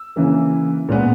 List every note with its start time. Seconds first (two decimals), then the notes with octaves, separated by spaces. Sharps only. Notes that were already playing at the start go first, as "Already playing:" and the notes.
Already playing: E6
0.16 C#3 E3 A#3
0.89 A#2 G#3 B3